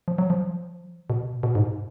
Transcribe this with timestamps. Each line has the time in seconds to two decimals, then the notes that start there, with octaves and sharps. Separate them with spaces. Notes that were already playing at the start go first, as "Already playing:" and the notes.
0.08 F3
0.18 F#3
0.30 F3
1.10 B2
1.43 B2
1.55 G#2